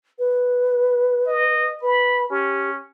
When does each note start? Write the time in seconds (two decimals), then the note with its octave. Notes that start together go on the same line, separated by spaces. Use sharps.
0.19 B4
1.27 D#5
1.82 B4 B5
2.30 C#4 G4